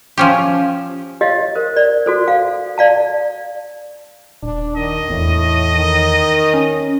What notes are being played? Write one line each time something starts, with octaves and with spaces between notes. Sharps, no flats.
F3 C#4 G4
G4 C#5 D#5 F5
A#4 C5
D5
F#4 A4 C5
F5
D5 F5 A5
D#1 D4
D#3 D#5
E2 A2
D#3
C#4